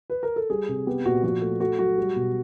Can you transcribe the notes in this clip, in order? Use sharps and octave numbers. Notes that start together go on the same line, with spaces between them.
B4
A#4
A4
G3 G#4
C3
B3 G4
A#2 F#4
F3 F#4
A3
A3 F#4
F#3 F#4
G3
B2